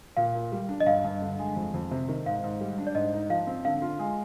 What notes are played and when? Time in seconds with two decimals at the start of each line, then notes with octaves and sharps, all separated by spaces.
0.17 A#2 F5
0.35 A#2
0.52 G3
0.69 D4
0.80 D#5
0.86 G2 F5
1.04 G2
1.22 D3
1.39 G#3
1.56 F2
1.74 F2
1.91 C3
2.08 D#3
2.26 G#2 F5
2.44 G#2
2.61 G3
2.78 D4
2.87 D5
2.95 G#2 D#5
3.13 D#4
3.30 F3 F5
3.47 C4
3.65 D3 F5
3.82 F4
3.99 G#3